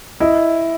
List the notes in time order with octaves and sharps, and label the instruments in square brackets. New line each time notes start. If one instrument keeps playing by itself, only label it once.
[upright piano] E4 [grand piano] D#5